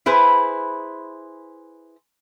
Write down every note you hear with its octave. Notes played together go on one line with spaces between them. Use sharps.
E4 G#4 B4 C5